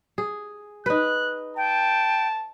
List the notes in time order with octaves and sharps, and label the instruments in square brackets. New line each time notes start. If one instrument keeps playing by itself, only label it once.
[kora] G#4
[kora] D#4 B4 [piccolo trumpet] F#6
[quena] G5 [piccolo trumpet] A5